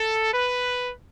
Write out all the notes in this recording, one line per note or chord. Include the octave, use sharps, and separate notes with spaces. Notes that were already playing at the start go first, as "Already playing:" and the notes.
Already playing: A4
B4